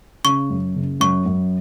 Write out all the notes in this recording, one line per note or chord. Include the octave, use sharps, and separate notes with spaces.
C#3 C#6
F#2
F#1
F#2 C#6
F#2